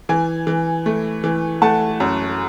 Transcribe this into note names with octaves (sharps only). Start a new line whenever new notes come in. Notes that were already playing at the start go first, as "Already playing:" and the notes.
E3 G#5
E3
A3
E3
A3 F#5 A5
F#2